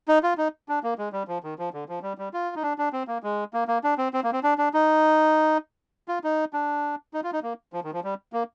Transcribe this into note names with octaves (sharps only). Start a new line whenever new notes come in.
D#4
F4
D#4
D4
A#3
G#3
G3
F3
D#3
F3
D3
F3
G3
G3
F4
D#4
D4
D4
C4
A#3
G#3
A#3
A#3
D4
C4
C4
A#3
C4
D4
D4
D#4
F4
D#4
D4
D#4
F4
D#4
A#3
F3
D#3
F3
G3
A#3